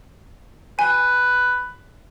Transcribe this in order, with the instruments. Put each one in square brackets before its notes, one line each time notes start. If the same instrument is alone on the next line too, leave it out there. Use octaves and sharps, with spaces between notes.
[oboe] B4 [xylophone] G#5